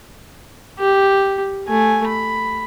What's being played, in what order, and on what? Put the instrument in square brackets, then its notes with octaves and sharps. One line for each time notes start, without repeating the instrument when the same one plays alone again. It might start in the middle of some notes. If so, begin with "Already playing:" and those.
[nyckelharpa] G4
A3 G#5
B5